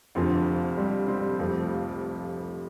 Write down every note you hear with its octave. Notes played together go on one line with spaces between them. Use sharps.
F1 F2 D3 C4 F4
G3 C4
G3 C4
F1 F2 F3 A3